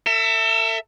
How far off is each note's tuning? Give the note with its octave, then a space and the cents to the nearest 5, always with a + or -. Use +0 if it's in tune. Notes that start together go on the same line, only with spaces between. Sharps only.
A4 +45 E5 +10